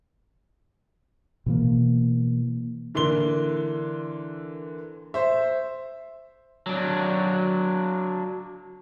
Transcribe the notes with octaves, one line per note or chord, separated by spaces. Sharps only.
B2 E3 A#3
D3 E3 A#3 C6 G7
C5 E5
F#3 D4